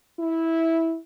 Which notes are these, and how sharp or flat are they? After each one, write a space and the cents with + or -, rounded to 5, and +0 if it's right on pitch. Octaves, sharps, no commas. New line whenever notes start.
E4 -10